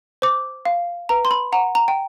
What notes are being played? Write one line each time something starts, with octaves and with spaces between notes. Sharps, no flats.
C5 D6
F5
B4 A#5
C6
B5
F#5 A#5
A#5
G5